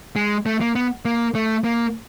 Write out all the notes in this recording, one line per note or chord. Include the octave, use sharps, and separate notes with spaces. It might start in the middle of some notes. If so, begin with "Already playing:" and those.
G#3
A3
A#3
B3
A#3
A3
A#3